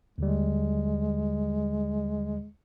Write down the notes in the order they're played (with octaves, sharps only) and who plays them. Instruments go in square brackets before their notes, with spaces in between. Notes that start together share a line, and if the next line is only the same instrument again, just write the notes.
[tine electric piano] D#2 D3 G3 [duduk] G#3